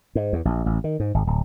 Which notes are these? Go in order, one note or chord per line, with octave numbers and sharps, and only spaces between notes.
G#2
E2
A#1
A1
D#3
G#2
G#1
D1